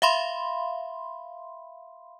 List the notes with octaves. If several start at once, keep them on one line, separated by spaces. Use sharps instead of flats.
E5 F5 B5 C6